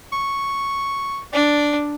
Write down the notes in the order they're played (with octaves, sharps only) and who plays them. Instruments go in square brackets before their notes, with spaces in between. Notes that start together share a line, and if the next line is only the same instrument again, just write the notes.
[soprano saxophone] C#6
[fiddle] D4 [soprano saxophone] D5